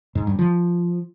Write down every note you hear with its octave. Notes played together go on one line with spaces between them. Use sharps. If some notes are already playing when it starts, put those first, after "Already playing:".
G#2
G2
F3